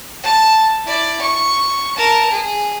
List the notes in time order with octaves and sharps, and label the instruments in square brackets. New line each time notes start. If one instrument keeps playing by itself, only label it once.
[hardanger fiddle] A5
E4 D5
C#6
A#4 A5
G#4